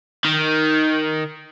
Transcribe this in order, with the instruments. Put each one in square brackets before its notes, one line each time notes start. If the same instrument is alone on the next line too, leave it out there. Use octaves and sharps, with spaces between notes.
[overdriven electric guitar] D#3